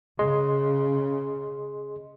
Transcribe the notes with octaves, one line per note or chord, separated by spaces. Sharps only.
C#3 G#4 D#5 C6